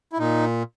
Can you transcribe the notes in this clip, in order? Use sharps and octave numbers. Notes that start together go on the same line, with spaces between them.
E4
A#2 D#4